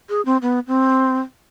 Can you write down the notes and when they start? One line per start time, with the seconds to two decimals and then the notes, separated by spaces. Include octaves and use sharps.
0.10 G#4
0.26 C4
0.42 B3
0.68 C4